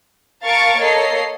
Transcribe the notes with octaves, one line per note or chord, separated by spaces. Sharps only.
A#4 F5 A5 C#6 A6 D7
A#3 A4 C#5 D#5 C7